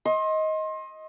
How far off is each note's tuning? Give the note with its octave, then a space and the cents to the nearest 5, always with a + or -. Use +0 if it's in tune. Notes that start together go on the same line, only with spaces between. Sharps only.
D#5 +15 C6 +30